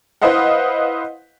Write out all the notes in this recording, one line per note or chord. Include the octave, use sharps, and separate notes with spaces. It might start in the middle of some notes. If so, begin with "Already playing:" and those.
E4 B4 C5 D#5 F5 F#5